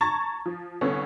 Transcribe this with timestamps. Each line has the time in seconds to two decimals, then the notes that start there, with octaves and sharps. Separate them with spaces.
0.01 A5 A#5 C#6 G#6 A6
0.46 F3
0.81 C2 D3 B3 C#4